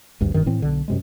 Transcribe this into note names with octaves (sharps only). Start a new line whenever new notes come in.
G#1 D2 G2
E1 G2 D#3
A2 E3 C4
B1 D3
F#2 C3 G#3